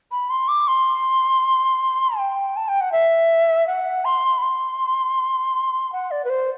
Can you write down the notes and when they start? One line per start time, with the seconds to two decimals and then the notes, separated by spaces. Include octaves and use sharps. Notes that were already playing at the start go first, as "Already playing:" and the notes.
0.11 B5
0.30 C6
0.48 D6
0.67 C6
2.18 G5
2.56 A5
2.68 G5
2.80 F#5
2.92 E5
3.67 F#5
4.04 C6
4.37 B5
4.42 C6
5.92 F#5
6.11 D5
6.24 B4
6.29 C5